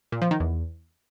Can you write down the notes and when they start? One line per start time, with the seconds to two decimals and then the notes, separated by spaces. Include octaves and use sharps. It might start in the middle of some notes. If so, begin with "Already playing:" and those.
0.12 A#2
0.22 F3
0.31 D#3
0.40 E2